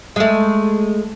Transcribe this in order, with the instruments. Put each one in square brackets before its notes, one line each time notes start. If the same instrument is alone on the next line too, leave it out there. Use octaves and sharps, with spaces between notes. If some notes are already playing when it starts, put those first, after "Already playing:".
[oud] G#3 A3